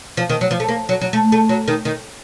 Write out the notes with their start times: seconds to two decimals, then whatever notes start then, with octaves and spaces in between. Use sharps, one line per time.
0.17 F3
0.30 D#3
0.41 F#3
0.51 F3
0.60 A3
0.68 A#3
0.89 F#3
1.01 F#3
1.13 A3
1.32 A3
1.49 F#3
1.68 D#3
1.85 D#3